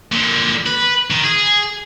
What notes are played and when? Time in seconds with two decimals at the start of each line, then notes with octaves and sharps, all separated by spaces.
0.12 A#2 D3
0.66 B4
1.11 D#3
1.24 G#4